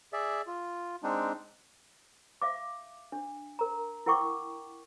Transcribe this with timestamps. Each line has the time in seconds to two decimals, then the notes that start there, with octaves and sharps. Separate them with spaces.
0.13 G#4 D5 E5
0.47 F4
1.03 G#3 C4 D4 D#4
2.42 E5 F5 D6
3.12 D4
3.59 A#4 A#5
4.06 E4 A#4 F#5 G5 C#6 D6